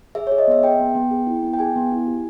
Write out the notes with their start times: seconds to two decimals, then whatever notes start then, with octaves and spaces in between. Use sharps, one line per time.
0.15 G#4 E5
0.27 G#4 C#5
0.38 D#5
0.48 B3 E5
0.63 G#4 G5
0.80 B3
0.95 B3
1.11 G#4
1.27 E4
1.43 B3
1.53 G5
1.59 G#4 G#5
1.76 B3
1.91 E4
2.07 G4